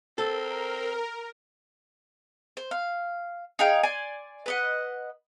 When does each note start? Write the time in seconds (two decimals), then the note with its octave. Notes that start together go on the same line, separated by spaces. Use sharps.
0.18 C4 A4 A#4
2.57 C5
2.71 F5
3.59 D#4 G#4 F5 G5
3.83 D5 G#5 C6
4.46 B4 D#5 F#5